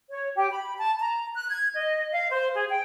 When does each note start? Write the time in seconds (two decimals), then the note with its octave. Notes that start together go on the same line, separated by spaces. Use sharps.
0.10 C#5
0.36 G4
0.51 B5
0.78 A5
0.98 A#5
1.34 F#6
1.50 G#6
1.75 D#5
2.12 F5
2.31 C5
2.54 G#4
2.68 G5